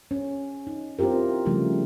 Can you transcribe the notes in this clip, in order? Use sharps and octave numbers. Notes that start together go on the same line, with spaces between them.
C#4
D#4
C4 E4 F4 G4 A#4
C#3 F3 G3 A3